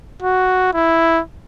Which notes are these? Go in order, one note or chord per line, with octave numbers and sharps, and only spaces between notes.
F#4
E4